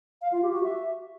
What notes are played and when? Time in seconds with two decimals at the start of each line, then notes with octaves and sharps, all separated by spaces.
0.22 F5
0.32 F4
0.43 G4
0.53 F#4
0.64 E5